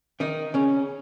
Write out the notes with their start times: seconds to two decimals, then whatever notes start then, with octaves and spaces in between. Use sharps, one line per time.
0.20 D#3 D#4
0.54 C#3 C#4